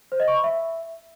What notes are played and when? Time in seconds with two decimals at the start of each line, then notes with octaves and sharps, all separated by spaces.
0.12 C5
0.20 D#5
0.28 C#6
0.36 B5
0.44 E5